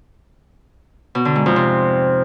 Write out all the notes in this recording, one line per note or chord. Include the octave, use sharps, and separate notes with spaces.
B2
D3
G#2
F2
C3